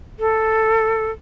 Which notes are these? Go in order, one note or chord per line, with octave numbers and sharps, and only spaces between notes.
A4